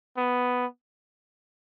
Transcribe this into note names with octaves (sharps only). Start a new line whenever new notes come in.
B3